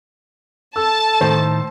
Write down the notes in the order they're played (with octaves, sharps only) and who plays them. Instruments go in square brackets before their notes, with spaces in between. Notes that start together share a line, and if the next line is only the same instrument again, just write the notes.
[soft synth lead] A4 [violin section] A5 [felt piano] E6
[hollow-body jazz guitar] A2 D#3 [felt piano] C5